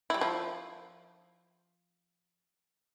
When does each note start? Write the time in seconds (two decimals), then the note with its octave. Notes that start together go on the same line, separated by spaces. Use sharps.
0.10 G3 E4
0.21 F3